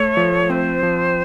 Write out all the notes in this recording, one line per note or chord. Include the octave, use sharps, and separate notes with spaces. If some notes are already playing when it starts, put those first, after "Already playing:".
Already playing: A3 C#5
F3
C4 C5
F3